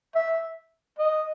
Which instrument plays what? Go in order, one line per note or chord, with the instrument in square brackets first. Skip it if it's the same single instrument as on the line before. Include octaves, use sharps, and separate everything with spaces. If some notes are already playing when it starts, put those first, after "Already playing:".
[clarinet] E5
D#5